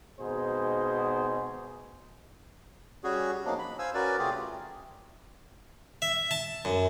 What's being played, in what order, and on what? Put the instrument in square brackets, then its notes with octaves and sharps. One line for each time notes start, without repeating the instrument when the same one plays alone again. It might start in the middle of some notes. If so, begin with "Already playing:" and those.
[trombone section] G#1 B2 D#4 G#4 C5
[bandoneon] G3 C#4 F#4 G#4
F3 F#3 A#3 B3 D4 D#4
B5
C5 F5 G#5 E6
C#4 F#4 A#4 B4 D5
C3 A3 C4 F4 G4 G#4
[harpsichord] E5
A5
F#2